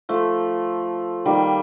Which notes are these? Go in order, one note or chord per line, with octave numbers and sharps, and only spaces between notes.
F3 A3
D#3 G3 A#3